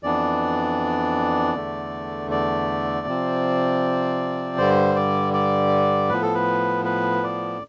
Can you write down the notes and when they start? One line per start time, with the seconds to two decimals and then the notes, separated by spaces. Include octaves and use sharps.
0.03 F2 E3 B3 D4 D5
1.55 E2 D3 A3
2.31 D5
3.07 C3 F3 C4
4.58 G2 D3 G3 C5
4.95 D5
5.33 D5
6.09 A2 F3 B3 B4
6.22 A4
6.34 B4
6.85 B4
7.23 D5